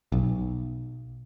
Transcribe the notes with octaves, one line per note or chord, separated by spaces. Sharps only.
B1